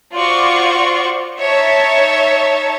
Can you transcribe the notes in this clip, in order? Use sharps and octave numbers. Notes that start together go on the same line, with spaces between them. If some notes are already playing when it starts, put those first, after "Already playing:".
F4 F#4 C5 D5 F#5 C#6
D#4 C#5 E5 A5